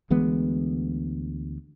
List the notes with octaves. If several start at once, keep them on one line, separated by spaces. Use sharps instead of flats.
D2 E3 G#3 B3